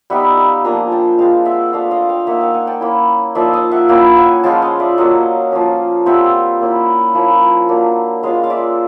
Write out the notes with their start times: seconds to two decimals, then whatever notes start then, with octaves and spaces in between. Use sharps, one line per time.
0.10 G3 B3 D#4 E5 F#5
0.37 F5 G5
0.64 F3 A#3 D4 G#5 A#5
0.92 G5 A5
1.19 G#3 C4 F4 F5 G5
1.45 E5 F#5
1.73 A3 D4 F4 D#5 F5
1.91 D#5 F5
2.09 F5 G5
2.27 A#3 D#4 E5 F#5
2.41 F5 G5
2.54 F#5 G#5
2.67 G5 A5
2.81 A#3 C#4 E4
3.35 F3 A#3 D#4 D5 E5
3.53 D#5 F5
3.71 E5 F#5
3.89 A#3 C#4 E4 F5 G5
4.17 F#5 G#5
4.44 F3 G#3 C#4 F4 G5 A5
4.62 D#5 F5
4.80 D5 E5
4.98 F#3 A#3 C#4 D#5 F5
5.52 F3 A#3 C#4
6.06 G3 C4 F4 E5 F#5
6.61 A#3 C#4 E4
7.14 F3 A#3 C#4 E4
7.69 F#3 A#3 D4
8.23 G#3 C#4 F4 D#5 F5
8.43 F5
8.50 D5 E5